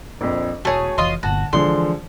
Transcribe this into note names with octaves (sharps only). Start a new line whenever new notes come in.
A#1 F2
E1 A3 F#4 G#4 C#5
F1 E3 F4 D#5 C6
G1 A#2 F#4 A5
D3 E3 F3 G#3 C6